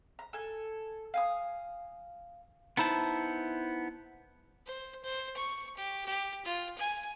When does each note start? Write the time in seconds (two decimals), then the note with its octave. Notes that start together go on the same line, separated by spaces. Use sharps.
0.19 A#5
0.33 A4 G#5
1.14 F5 G#5 D#6
2.77 B3 D#4 E4 C5 A5
4.66 C5
5.04 C5
5.37 C#6
5.77 G4
6.06 G4
6.45 F4
6.78 G#5